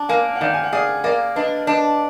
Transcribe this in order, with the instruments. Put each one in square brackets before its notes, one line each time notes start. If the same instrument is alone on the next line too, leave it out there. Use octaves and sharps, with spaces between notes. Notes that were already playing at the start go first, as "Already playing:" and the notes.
Already playing: [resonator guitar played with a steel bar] D4
[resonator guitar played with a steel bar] A#3 [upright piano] F5 G#5
[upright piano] F#5
[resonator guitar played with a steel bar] D#3 [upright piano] D5 F5
[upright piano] G#5
F#5
[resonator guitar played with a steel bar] G#4 [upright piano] D5 F5
[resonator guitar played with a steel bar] A#3 [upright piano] D5 F5
[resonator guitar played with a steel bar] D4 [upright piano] B4 D#5
[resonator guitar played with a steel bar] D4 [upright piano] B4 D#5